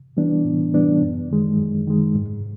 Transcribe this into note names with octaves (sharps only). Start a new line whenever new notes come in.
E3 G3 B3 D4
A2
E3 G3 B3 D4
F#2
D#3 G#3
F#2
D#3 G#3
G#2